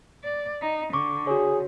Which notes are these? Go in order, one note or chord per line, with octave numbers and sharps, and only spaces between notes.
D5
D#4
D3 C#6 D6
F#4 G#4 C#5